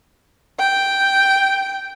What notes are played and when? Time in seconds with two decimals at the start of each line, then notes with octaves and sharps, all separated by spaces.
0.59 G5